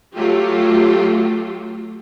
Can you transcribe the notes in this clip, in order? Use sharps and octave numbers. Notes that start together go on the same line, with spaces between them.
F#3 A3 F4 G4